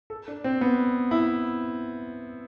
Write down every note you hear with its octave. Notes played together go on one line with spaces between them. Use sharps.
A4
D4
C4
B3
E4